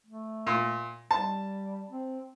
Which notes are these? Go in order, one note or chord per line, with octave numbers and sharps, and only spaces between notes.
A3
A#2
G3 A5
C4